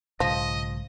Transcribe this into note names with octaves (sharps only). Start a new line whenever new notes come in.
B1 G#2 C#3 F3 D#5